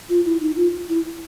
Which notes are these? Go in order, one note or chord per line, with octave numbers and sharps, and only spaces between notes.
F4
E4
D#4
F4
E4